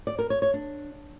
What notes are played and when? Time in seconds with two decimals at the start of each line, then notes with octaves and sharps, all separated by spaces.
0.07 D5
0.19 A#4
0.30 C#5
0.42 C#5
0.54 D4